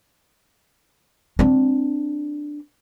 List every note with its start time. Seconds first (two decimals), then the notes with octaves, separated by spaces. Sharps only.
1.39 C4 D4